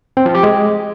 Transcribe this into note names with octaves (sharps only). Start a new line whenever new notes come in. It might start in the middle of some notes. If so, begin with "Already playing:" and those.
C4
F3
G4
G#3